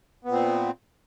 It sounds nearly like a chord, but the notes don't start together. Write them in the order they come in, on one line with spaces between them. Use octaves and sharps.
B3 A#2 C4